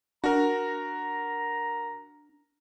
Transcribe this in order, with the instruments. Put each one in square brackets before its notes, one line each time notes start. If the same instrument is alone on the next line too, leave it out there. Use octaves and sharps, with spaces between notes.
[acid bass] D4 [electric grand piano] F#4 A#4 [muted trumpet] A#5